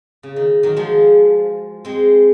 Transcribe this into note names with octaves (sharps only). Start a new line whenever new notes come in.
C#3
D#3
D#3 F#3
F3 G#3
G#3 C4